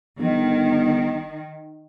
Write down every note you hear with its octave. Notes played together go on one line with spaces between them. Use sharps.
G1 D#3